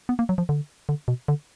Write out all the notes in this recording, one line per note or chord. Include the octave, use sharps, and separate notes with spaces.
B3
A#3
F#3
F3
D3
D3
B2
D3